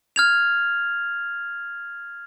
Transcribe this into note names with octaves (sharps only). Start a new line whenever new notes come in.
F6 G#6 F7